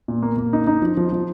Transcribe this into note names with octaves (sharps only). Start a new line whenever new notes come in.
A#2
A#3
A#3
D#4
D#4
F3
F3
F3